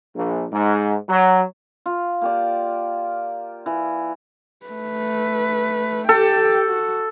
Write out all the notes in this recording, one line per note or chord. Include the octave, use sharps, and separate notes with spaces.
A#1
G#2
F#3
F4
A#3 G4 D5
E3
A3 B4
G4 A4 G5
F#4